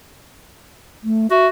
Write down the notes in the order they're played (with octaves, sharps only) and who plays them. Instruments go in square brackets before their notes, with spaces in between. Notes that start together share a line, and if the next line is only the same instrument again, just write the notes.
[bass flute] A3
[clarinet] F#4 [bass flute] E5